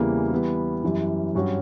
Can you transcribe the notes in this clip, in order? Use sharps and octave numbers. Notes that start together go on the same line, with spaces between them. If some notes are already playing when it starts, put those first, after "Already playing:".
Already playing: E2 C#3 E3 G3 A#3
E3 G3 B3 E4
F#2 E3 G3
G2 F#3 C#4 F#4